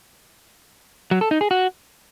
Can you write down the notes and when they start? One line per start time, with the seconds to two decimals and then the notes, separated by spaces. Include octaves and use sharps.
1.11 F#3
1.21 A4
1.31 D#4
1.41 G#4
1.51 F#4